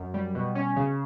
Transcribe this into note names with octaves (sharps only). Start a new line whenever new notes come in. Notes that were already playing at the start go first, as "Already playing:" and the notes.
Already playing: F#2
G3
B2
C#4
C#3